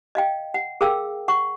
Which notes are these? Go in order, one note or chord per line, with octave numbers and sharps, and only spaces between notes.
D#5 F5 G5
F#5
G#4 A#4 F5 G5 E6
F#5 C#6